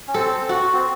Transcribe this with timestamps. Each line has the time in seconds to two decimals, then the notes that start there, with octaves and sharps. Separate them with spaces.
0.08 C#4
0.14 C4 A4
0.49 F#4
0.74 C4